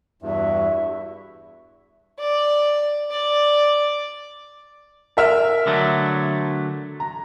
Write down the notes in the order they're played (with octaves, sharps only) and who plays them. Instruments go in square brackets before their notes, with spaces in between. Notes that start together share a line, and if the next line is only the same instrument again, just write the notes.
[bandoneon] E2 G2 [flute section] E4 F#4 E5
[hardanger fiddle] D5
D5
[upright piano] A#4 E5 F6
[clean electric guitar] D3 F#3 A3
[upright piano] A#5